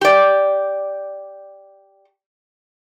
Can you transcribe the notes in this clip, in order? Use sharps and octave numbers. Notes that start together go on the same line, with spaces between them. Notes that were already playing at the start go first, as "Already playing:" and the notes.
G4 D5